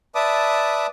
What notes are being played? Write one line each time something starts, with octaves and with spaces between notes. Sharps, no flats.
B4 D5 E5 A5 D6 D#6